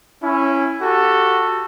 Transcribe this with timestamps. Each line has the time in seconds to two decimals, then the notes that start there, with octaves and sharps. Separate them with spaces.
0.22 C#4 E4
0.82 F#4 G4 A4